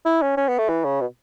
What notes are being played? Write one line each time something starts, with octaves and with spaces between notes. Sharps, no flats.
E4
C#4
C#4
B3
A3
E3
C#3
B2